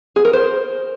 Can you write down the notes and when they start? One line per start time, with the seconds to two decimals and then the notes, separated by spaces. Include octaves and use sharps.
0.16 G#4
0.25 A#4
0.33 C5